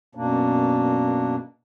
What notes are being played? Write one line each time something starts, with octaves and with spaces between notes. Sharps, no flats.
F#2 B2 A#3 D4